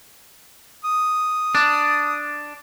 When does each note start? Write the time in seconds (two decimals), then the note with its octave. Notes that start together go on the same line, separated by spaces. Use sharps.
0.85 D#6
1.55 D4